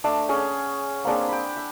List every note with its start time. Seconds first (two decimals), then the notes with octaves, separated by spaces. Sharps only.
0.04 A3 D4
0.29 C#4 G#4 C#5 F#5
1.05 A#3 C4 D4 G#4
1.29 G5 B5
1.57 E5